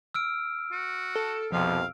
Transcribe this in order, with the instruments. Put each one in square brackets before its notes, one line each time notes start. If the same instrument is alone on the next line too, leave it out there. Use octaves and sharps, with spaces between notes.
[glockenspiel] E6 F6 D7
[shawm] F#4
[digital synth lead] A4
[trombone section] C2 F2 B2 [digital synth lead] F3 [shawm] F5